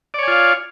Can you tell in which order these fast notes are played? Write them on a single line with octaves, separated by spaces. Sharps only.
D5 C#5 G#5 F4 F5